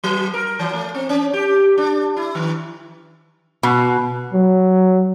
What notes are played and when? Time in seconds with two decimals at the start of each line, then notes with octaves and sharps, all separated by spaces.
0.04 F#3
0.34 A#4
0.59 E3
0.73 A3
0.95 C4
1.09 C#4
1.34 G4
1.78 D4
2.17 E4
2.35 D#3
3.63 B2
4.34 F#3